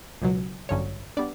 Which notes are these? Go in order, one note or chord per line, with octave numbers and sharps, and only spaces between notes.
C#2 B2 F#3
A1 G2 D3 F#3 C#4 C#5
G3 B3 D4 D5